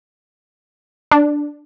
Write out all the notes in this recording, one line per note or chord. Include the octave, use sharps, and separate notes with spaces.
D4